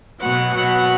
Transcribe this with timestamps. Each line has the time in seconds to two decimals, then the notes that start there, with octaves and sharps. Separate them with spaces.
0.20 B2 F#3 B3 F#5
0.53 B2 F#3 B3 F#5